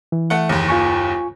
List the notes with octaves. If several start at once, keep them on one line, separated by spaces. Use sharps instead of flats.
E3
A3 F#5
F#1 D#2
F4 G#5 C#6